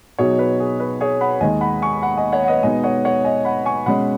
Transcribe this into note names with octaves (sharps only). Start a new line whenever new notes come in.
B2 F#3 D#4 G#4 C#5
B4
G#4
B4
G#4 C#5
F#5 B5
D#2 D#3 G#3 D#5 G#5
F#5 B5
G#5 C#6
F#5 B5
D#5 G#5
C#5 F#5
F#5
B4 D#5
B2 G#3 B3 D#4 D#5 G#5
C#5 F#5
C#5 F#5
D#5 G#5
F#5 B5
G#5 C#6
B2 G#3 C#4 F#5 B5